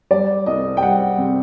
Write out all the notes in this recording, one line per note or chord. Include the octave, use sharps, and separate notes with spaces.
G3 D5
C2 D#5
G5
G3 F#5
C3